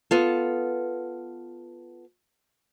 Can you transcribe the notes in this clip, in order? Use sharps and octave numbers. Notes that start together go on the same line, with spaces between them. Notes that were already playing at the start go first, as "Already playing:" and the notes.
B3 F4 A4